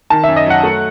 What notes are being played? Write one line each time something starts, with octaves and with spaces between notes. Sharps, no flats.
D#3 A5
E5
F#2
D#5
F#3 F#5
A3